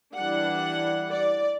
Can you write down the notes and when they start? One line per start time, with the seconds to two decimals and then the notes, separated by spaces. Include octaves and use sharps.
0.15 E3 G3 D4 F#5
1.11 D5